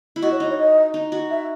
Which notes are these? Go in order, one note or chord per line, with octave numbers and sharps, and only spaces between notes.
E4
F#4 D#5
C#5
D#4 D#5
C#5
D#5
D#4
F#4
E5